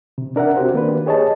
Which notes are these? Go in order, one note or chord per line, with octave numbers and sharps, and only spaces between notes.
C3
D4 A#4 E5 F#5
C4 F#4 G4 C5
D#3 A#3 D4 B4
G4 G#4 C#5 D#5 A5